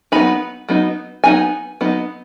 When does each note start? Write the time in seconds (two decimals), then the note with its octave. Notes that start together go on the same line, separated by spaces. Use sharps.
0.12 F#3 B3 D#4 B5
0.69 F#3 B3 D#4
1.24 F#3 B3 D#4 G#5
1.81 F#3 B3 D#4